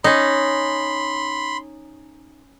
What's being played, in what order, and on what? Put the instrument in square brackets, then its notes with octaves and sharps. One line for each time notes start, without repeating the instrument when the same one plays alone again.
[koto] C#4 D#4 [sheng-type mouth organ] B5 C6